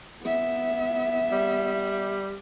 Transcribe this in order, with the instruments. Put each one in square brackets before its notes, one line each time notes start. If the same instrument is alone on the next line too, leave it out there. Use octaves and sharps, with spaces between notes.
[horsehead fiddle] B3 E5
[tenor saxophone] G3